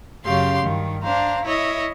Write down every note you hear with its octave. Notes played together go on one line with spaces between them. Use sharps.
F#2 C#3 F#3 G4 F5 C6
G2 D#3
D4 C5 F5 A#5
E4 C#5 D#5 E5